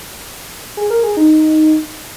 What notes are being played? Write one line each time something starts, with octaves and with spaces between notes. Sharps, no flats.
G#4
A#4
G#4
D#4